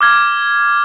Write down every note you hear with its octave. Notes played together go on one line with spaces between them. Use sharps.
D6 F6 G#6